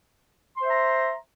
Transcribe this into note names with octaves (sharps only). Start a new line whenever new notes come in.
C5 E5 A#5 C6